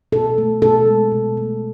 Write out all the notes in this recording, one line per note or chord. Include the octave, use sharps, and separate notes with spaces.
B2 A4
A3
B2 A4
G#3
B2
A3